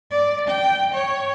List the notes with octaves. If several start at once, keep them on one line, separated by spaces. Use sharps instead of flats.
D5
G5
C#5